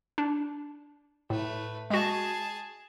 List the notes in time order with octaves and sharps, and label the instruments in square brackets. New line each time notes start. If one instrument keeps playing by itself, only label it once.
[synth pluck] D4
[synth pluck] A2 [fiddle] A3 B4
[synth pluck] G#3 F#4 [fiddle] G#4 A5